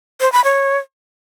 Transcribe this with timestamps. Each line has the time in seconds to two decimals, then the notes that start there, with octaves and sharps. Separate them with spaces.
0.21 C5
0.32 B5
0.44 C#5